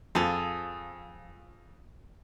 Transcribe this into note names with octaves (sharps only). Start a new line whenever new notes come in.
F2 F3 G#4 A4